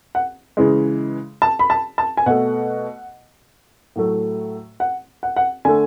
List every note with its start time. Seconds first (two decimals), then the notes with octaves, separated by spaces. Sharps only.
0.15 F#5
0.57 C#3 E3 G#3
1.42 A5
1.59 B5
1.70 A5
1.98 A5
2.17 G#5
2.26 B2 A3 F#5
3.96 A2 F#3 A3
4.80 F#5
5.23 F#5
5.36 F#5
5.65 D3 A3 G#5